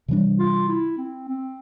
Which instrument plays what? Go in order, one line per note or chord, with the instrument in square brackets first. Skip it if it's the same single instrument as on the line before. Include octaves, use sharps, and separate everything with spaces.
[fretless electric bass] C3 E3 G3 D4
[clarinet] F4
E4
C4
C4